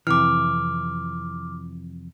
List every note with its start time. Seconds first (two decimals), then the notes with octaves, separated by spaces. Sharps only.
0.07 F2 C3 E3 D6 F6